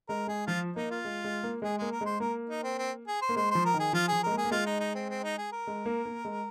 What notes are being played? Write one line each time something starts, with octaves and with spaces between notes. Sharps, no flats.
G#3 A#4
G#3 G#4
F3 F4
A#3 D#4
F4
G#3
G#3
A#3
G#3 G#4
G#3 A#3
A#4
G#3 C5
A#3 A#4
D#4
C4
C4
G#4
C5
A#3
G#3 C5
F3 C5
A#4
D#3
G#4
F3 F4
F3 G#4
G#3 A#4
A#3
G#4
A#3
G#3 F4
D#4
D#4
C4
C4
D#4
G#4
A#4
G#3
A#3
A#3
G#3